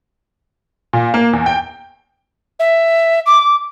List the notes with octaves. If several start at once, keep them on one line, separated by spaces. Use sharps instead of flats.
A#2
A#3
E2
G5
E5
D6